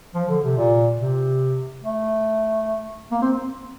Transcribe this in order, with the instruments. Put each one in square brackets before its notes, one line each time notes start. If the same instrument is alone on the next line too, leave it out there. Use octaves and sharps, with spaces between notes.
[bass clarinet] F3
D3
C3
A#2
C3
A3
A#3
C4